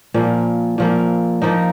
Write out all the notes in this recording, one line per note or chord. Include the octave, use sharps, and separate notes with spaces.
A#2 F3 A#3
A#2 F3 A#3
F3 A#3 D#4